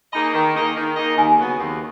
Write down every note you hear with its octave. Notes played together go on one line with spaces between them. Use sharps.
A#3 D#4 G#4 D#5 B5
D#3 A#5
A#3 D#4 G#4 D#5
D#3
A#3 D#4 G#4 D#5
D#2 G#5
C#3 F#3 B3 F#4
D#2